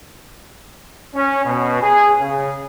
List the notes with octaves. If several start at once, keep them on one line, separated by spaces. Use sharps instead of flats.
C#4
B2
G#4
C#3